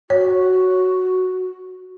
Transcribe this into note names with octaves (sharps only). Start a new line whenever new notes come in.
F#4 C#5